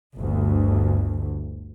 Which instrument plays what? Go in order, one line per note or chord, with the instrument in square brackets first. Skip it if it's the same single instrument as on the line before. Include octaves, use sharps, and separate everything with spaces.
[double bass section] G1 D2